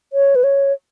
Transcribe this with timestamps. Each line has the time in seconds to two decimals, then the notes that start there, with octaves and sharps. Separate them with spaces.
0.13 C#5
0.35 B4
0.44 C#5